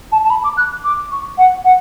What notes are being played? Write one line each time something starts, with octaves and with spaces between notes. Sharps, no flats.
A5
A5
B5
D6
F#6
D6
C#6
F#5
F#5